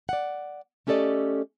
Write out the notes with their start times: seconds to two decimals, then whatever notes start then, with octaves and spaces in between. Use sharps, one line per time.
0.09 D5 F#5
0.87 A3 C#4 G4 A4 D5 D#5